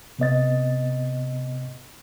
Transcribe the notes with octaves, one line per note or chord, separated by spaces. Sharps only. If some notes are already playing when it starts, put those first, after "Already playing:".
C3 B3 D#5 A6